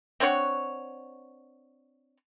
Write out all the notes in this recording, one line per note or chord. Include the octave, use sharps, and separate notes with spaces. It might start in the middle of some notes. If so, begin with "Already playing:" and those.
C4 D4 C#5 F#5